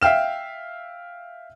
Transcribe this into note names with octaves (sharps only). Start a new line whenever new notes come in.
E5 F5 G5 F6 E7